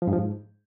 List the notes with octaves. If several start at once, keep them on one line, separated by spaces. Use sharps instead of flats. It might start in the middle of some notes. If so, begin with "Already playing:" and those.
F3
G2
F3
G#2